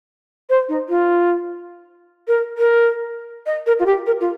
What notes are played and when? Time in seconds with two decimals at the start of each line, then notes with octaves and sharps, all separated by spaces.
0.50 C5
0.69 D#4
0.89 F4
2.28 A#4
2.58 A#4
3.46 D#5
3.67 A#4
3.80 F4
3.86 G4
4.06 A#4
4.21 F4